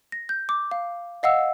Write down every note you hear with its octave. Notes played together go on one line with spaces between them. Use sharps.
A#6
G6
D6
F5
D#5 F5 F#5 E6